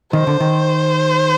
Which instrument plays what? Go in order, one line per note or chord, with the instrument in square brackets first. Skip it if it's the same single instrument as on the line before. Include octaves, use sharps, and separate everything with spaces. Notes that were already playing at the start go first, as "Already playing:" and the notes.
[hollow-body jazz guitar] D#3 [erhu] C5
[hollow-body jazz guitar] D3
D#3